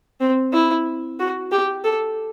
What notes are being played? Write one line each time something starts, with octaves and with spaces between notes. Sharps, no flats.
C4
E4
F#4
G4
A4